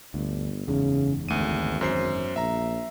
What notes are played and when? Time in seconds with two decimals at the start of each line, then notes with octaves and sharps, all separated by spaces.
0.14 G1 D2
0.67 F#1 E2 G#2 C#3
1.29 G#1 D2 D#7
1.81 F#2 C5 C7
2.36 A#1 E5 A#5